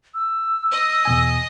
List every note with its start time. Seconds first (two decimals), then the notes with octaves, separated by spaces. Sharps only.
0.15 E6
0.71 D#5
1.05 E2 B2 G#5